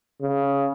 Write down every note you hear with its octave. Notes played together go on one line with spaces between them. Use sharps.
C#3